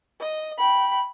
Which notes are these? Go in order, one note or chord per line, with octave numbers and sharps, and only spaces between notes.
D#5
G5 B5